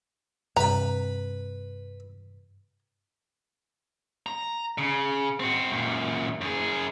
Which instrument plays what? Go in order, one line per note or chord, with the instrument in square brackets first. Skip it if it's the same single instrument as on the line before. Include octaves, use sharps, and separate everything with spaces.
[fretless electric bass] G2 C3 [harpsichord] B4 B5 [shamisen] A#5
[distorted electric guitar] A#5
C#3
C4 F#4
F#2 A#2
F#2 G#4